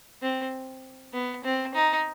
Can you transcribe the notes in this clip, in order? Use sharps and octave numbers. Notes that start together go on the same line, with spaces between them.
C4
B3
C4
D#4